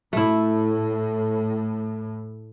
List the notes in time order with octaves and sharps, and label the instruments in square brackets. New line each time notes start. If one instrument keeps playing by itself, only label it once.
[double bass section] A2 [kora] A3 E4